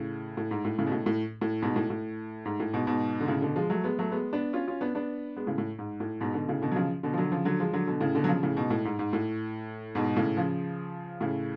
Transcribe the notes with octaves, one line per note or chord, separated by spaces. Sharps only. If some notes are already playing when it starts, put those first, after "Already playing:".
Already playing: A2 C#3
A2
G#2
A2
A2 C#3
B2
A2
A2
A2
G#2 B2
A2
A2
G#2
A2
G#2 B2
G#2 B2
D3
A2 C#3
B2 D3
F3 G#3
F#3 A3
G#3 B3
F#3 A3
G#3 B3
B3 D4
C#4 F4
C#4 F4
B3 D4
B3 D4
G#3 B3
A2 C#3
A2
G#2
A2
G#2 B2
B2 D3
A2 C#3
B2 D3
F#3
C#3 F3
B2 D3
F3
D3 F#3
C#3 F3
D3 F#3
F3 G#3
D3 F#3
B2 D3
A2 C#3
B2 D3
F#3
C#3 F3
A2 C#3
G#2 B2
A2
G#2
G#2
A2
G#2 B2
A2 C#3
C#3 F3
A2 C#3